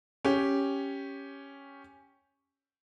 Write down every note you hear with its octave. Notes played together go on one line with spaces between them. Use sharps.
C#4 G4